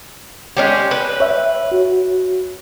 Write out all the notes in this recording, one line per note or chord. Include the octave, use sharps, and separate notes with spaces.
G#3 C#4 G4
B4
C#5 E5
F#4